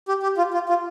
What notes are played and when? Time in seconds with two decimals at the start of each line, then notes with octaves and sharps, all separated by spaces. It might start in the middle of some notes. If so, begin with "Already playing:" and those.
0.08 G4
0.23 G4
0.37 F4
0.54 F4
0.69 F4